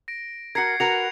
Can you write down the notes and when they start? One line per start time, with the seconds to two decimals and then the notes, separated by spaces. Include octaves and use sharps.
0.08 A#6 D7
0.55 F#4 A#4 G#6 C7 C#7
0.80 F#4 A#4 B4 C#7 F7